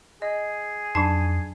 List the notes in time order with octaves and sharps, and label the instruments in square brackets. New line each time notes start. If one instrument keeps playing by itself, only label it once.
[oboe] G#4 [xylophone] D#5
[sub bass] F2 [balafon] F#3 D4 D#4 [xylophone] A5